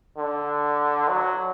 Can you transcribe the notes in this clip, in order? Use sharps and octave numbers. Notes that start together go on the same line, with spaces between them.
D3
F#3